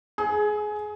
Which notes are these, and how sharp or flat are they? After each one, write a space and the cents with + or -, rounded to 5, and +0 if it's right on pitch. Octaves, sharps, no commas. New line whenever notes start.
G#4 +20